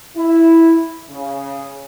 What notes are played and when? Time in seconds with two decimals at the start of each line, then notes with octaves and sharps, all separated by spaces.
0.17 E4
1.10 C#3